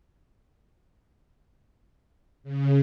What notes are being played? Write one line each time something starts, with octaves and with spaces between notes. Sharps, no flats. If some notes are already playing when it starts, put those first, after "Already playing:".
C#3